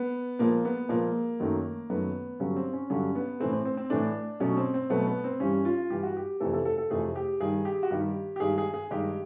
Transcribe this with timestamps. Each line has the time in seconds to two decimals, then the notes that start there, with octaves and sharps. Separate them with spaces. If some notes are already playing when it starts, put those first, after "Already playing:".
Already playing: B3
0.39 A#2 F3 G#3 A#3
0.65 B3
0.89 A#2 F3 G#3 A#3
1.40 F#2 D#3 F#3 A3
1.90 F#2 D#3 F#3 A3 B3
2.40 G2 D3 F#3 C#4
2.56 C4
2.73 C#4
2.90 G2 D3 F#3 C#4
3.15 B3
3.40 A2 E3 A3 C4
3.53 C4
3.65 C4
3.77 C4
3.90 A2 E3 A3 D4
4.40 B2 F#3 A3 C#4
4.57 C4
4.74 C4
4.90 B2 F#3 A3 B3
5.07 B3
5.24 C4
5.40 G2 E3 G3 C#4
5.65 F4
5.90 G2 E3 G3 G4
6.03 F#4
6.17 G4
6.40 F2 C3 E3 A3 A4
6.53 A4
6.65 A4
6.78 A4
6.91 F2 C3 E3 A3 G#4
7.16 G4
7.40 G2 D#3 G3 G#4
7.65 G4
7.83 F#4
7.91 G2 D#3 G3 G4
8.36 G4
8.40 G2 D#3 G#3 G#4
8.58 G#4
8.74 G#4
8.91 G2 D#3 G#3 G4